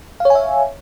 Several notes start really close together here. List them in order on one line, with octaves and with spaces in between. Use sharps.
F5 C#5 G#5 E5